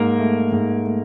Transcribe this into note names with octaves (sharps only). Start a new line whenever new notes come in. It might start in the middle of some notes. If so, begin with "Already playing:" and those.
Already playing: G#2 A#3
A3
G#2
A3